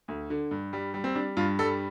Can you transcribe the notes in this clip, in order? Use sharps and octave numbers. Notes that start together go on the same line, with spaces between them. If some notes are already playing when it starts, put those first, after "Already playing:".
D2
D3
G2
G3
G3
C4
G3 D4
G2 F4
G3 A4